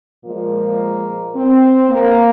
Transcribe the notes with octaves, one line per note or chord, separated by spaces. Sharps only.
A#2 F3 G#3 A#3
C4
A#3